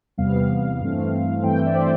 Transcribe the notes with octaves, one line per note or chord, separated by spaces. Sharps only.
E2 C3 G3 B3 F5
G2 E3 A3 C4
G2 E3 A3 C4 G5
E5
D5
C5